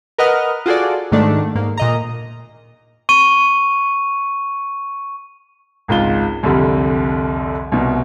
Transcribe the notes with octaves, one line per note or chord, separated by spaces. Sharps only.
A#4 B4 D#5 F#5 F6
F4 F#4 G#4 A4 D5
G#2 D#3 A3 D4
G#2 A#3
A#2 D#5 A#5
C#6 D#7
G#1 C#2 F4 G7
C2 F2 D3 G3
C2 B2